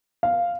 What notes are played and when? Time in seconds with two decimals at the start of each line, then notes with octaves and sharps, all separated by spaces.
0.23 F5